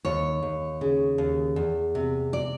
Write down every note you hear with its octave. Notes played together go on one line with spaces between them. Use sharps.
D#2 C#5
D#2
C#3
D#2
E2
C3
D5